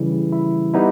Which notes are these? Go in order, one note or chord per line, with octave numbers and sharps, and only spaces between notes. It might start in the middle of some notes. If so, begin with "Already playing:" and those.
Already playing: C#3 E3 G3 E4
E4
G3 B3 D#4 E4